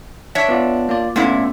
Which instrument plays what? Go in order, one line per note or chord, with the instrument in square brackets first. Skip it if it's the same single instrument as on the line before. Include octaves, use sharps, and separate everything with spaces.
[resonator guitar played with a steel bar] D4 C#5 E5
[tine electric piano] B3 F4 D5
A#3 F4 D5
[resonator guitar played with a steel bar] A#2 D3 E4 [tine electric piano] A3 B3 C#4